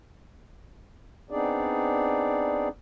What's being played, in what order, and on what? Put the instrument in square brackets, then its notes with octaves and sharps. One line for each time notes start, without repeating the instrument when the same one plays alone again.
[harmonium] B3 C4 D4 D#4 G#4 D5